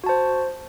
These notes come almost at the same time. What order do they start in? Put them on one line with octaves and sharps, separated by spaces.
F#4 A5 C5